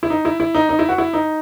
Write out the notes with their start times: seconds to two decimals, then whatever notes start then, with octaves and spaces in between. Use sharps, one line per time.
0.03 E4
0.10 D#4
0.25 E4
0.40 E4
0.55 D#4
0.69 D#4
0.79 E4
0.89 F#4
0.98 E4
1.13 D#4